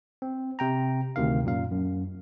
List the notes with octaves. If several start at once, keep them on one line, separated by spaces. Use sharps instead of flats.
C4
C3 G5 A#5
D2 C3 D#3 F5
F#2 A#2 F5
F#2